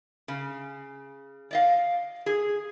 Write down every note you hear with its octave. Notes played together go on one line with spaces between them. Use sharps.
C#3
D5 D#5 F5
G#4